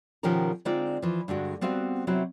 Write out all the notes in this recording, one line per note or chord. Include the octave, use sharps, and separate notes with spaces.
B2 D#3 F3 C#4 G4 A#4
D3 G#3 C4 D#4 F4 D5
E3 F3
G2 D3 G#3 F#4
G3 B3 C4 F#4 C5 F5
C3 F#3 C4 E4 F#4